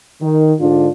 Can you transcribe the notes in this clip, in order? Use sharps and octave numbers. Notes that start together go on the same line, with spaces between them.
D#3
G#2 D3 D4 F4